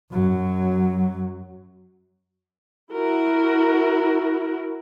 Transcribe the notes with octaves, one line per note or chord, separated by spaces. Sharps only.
F#2 F#3
E4 F#4 A#4